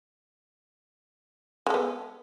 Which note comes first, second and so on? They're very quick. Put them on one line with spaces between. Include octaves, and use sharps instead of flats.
G#3 A4 B3